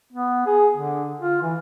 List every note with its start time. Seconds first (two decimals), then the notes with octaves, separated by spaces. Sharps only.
0.13 B3
0.46 G#4
0.76 D3
1.21 F4
1.42 E3